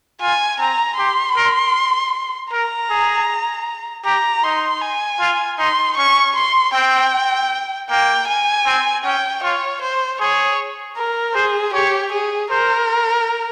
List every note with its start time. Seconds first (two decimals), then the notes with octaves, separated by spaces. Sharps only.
0.22 F4 G#5
0.59 C4 A#5
0.98 G4 C6
1.36 A#4
2.52 A#4 A#5
2.90 G#4
4.05 G4 A#5
4.44 D#4 C6
4.82 G#5
5.20 F4
5.59 D#4 C6
5.97 C#4 C#6
6.36 C6
6.74 C4 G5
7.90 A#3 G5
8.28 G#5
8.66 C4
9.05 C#4 G5
9.43 F4 C#5
9.81 C5
10.20 G#4 C#5
10.97 A#4
11.35 G#4 C5
11.74 G4 C#5
12.12 G#4
12.51 A#4 C5